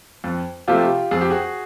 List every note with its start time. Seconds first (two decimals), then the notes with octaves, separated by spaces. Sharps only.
0.24 F2
0.68 C3 F3 A3 F4 G4
1.11 F2 G#4
1.21 G4
1.31 F#4 G#4